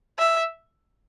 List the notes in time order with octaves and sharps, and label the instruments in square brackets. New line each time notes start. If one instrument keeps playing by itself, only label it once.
[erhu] E5